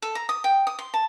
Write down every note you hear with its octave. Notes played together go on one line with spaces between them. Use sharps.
A4
A#5
D#6
G5
D#6
C6
A5